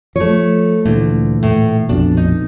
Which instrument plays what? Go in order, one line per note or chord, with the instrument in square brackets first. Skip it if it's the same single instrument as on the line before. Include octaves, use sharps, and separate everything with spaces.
[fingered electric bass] F3 [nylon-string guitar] A3 C#5
[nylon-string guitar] D2 [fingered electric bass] A#2 E3
[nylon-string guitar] A2
[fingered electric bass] A#1 F2 B2 [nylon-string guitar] D4
[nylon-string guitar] D#4